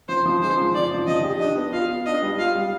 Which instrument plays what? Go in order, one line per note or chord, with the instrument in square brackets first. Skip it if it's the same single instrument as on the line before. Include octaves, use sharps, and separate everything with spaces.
[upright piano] F3 [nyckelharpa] C5
[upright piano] F3
[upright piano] G#3 [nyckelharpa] C5
[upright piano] F3
[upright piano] F3 [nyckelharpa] D5
[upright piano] F3
[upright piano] F3 [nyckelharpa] D#5
[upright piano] G4
[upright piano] D4 [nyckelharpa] D#5
[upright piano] B3
[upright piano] F4 [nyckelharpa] F5
[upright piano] B3
[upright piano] D4 [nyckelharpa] D#5
[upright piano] G3
[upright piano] F4 [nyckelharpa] F5
[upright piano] G3